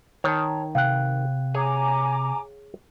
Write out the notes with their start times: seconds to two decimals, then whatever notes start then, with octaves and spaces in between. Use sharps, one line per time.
0.24 D#3 C#5 A5
0.75 C3 F5 G5 F#6
1.55 G#4 C#5 G#5 A#5 D6